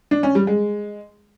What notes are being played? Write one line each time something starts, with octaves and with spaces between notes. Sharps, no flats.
D4
C#4
G3
G#3